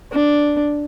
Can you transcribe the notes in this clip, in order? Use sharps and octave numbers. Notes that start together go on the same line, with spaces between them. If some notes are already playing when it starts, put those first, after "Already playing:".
D4